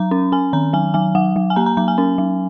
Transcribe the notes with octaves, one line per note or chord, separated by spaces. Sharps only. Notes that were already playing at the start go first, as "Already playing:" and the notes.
Already playing: F#3 A#5
C#4
C#4 G#5
D#3 A#5
F#3 G#5
F#3 G#5
F#3 F#5
F#3
G#5
A#3 A#5
A#5
F#3 A#5
G#5
C#4
F#3